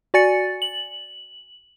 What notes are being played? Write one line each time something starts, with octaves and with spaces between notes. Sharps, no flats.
F#4 D5 G#5 A6 C#7
F#7